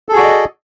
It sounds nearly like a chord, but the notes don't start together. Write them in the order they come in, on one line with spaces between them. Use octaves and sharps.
A4 G#4 F#4 D5 D#5